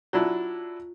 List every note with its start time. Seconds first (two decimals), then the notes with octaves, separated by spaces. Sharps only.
0.13 F#3 D4 E4 F4